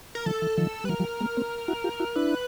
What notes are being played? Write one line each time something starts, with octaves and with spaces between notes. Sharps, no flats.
A#4
D#3 F3 A4
E3
D#3 F3
G3 B4
E3 F#3 A#4
F3 G3
G#3 A#3
A#3 C4
E4 F#4
F4 G4
E4 F#4
D4 E4 B4